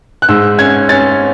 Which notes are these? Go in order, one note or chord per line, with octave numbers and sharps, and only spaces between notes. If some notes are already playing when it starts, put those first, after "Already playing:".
F#6
G#2 E6
C#4 G#6
C#4 A6